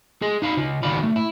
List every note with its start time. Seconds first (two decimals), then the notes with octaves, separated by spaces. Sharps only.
0.22 G#4 D#5
0.42 D#4 F5 A#5 B5
0.57 C#3 F4
0.83 C#2 D#3 F#4 D5 F5 B5
1.03 A3
1.16 E4